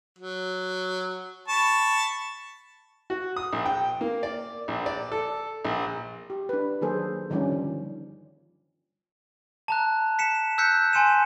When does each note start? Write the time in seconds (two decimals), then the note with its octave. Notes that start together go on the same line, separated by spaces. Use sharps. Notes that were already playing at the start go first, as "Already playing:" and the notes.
0.18 F#3
1.48 A5 B5 C#6
3.10 F#4
3.36 D#6
3.53 A#1
3.66 G5
4.01 A#3
4.23 D5
4.68 A#1
4.86 D5
5.12 A4
5.65 A#1
6.30 G4
6.49 D4 B4
6.81 D#3 F#3 A#3 G#4 A4 C5
7.30 D3 D#3 F3 G3 C#4 D4
7.52 D#3
9.68 A5 A#5 F#6
10.19 B6 C#7 E7
10.58 E6 F#6 G6 B6 C#7
10.93 G#5 C6 C#7 D#7 E7